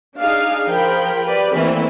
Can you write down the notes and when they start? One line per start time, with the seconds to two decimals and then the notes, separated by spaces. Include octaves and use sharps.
0.18 D4 D#4 G#4 F5
0.67 F3 G#4 A#4 G5 B5
1.25 G4 B4 D5
1.55 E3 A3 A#3 C4 C#4 E4